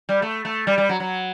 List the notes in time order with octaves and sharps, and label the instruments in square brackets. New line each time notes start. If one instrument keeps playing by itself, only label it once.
[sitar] G3
A3
A3
G3
G3
F#3
F#3